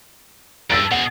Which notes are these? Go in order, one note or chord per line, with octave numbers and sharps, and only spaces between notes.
G2 E6 A6 D7
B2 G#4 F#5